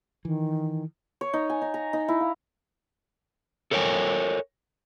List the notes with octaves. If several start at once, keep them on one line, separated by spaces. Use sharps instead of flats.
D#3 E3
C#5
D#4
G#5
D#4
A#5
D#4
E4
F5
A4 A#4 C#5 D5 G5 G#5